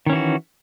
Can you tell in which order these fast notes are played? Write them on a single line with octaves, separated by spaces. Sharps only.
D#3 C#4 E3 F#4